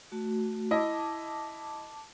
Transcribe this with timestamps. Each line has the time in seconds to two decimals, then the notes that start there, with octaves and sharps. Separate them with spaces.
0.12 A3 F#4
0.71 E4 D#5 A5 D6